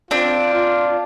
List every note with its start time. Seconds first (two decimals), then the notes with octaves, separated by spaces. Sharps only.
0.11 C4 D4 F4
0.54 F4